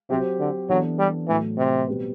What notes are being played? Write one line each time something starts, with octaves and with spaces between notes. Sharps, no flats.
C3 F#3 C4 G4 C5
D3
E3 F#3 B3 D4 A4
G3
A2 E3 F#3 A3
C3
B2 G3 C4 G4 B4